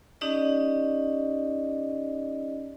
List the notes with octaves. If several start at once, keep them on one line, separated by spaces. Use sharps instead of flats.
C#4 D#4 G4 D5 D#5